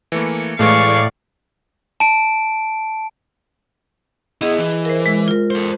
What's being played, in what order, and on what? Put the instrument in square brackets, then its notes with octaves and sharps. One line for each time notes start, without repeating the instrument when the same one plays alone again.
[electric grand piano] E3 A3 A#3 [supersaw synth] C#7
[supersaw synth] A2 D5 [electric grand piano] E3 G#3 A3 [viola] F5 C#6
[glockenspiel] A5 D7
[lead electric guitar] B3 E4 [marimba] G#4 D#5
[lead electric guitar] E3
[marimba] A#4 C5
G#3
F4 A#4
[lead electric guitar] A4 C5